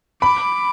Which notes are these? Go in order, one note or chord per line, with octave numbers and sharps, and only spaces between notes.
B5 D6